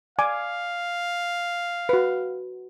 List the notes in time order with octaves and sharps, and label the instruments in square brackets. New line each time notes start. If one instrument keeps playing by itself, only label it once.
[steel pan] D5 G#5 D6 [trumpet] F5
[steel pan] F#4 B4